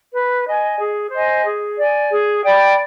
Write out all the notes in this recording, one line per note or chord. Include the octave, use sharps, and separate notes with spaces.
B4
D#5 G#5
G#4
C5 D#5 G#5
G#4
D5 G#5
G#4
D5 G5 B5